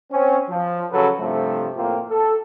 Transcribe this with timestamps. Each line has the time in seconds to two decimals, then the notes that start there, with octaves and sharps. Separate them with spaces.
0.11 C4 C#4
0.49 F3
0.91 C#3 F#3 A4 B4
1.20 G2 C3 F3 A3
1.76 A2 A#3 C4 F4
2.09 A4